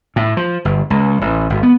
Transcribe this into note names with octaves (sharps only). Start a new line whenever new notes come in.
A2
F3
G1
C#2
A1
G#1
B3